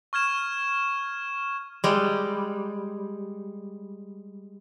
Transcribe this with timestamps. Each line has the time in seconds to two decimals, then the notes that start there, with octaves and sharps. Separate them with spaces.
0.13 C#6 F6 G#6 E7
1.84 G3 G#3